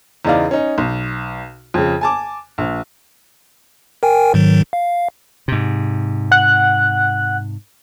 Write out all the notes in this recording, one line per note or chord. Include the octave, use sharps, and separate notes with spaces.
E2 C#3 D#4 D5 F5
C#4 D#4
B1
F2 C#3
G#5 A5 D6
A#1
A#4 G5 G#5
G#2 D#3 F#3
F5
G#2 C3
F#5 F#6